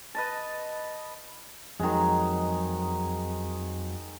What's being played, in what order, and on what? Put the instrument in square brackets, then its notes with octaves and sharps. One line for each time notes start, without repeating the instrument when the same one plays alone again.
[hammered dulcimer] B4 D#5 A5
[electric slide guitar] F2 F#3 [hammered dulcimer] D#3 G#3